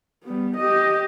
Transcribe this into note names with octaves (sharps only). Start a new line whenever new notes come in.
G3 B3
G4 D#5